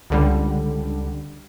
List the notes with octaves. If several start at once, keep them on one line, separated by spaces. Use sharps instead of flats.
C#2 D3 G3